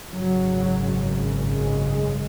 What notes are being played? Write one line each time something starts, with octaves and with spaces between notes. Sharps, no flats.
G#1 F#2 C#3 F#3
G#3